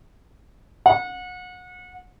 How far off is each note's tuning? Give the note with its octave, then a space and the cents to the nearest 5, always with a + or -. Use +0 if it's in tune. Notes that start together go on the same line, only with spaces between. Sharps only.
F#5 -30